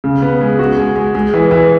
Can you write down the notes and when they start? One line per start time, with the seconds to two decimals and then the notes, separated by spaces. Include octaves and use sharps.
0.04 C#3
0.22 B3
0.41 G#3
0.59 F#4
0.77 G#3
0.96 G#3
1.15 G#3
1.34 E3
1.51 E3